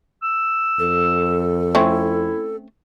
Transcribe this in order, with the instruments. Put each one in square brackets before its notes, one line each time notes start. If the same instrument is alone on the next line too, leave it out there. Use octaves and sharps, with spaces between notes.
[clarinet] E6
[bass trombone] F2 [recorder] A4
[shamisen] A3 C4 C#4 [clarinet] E4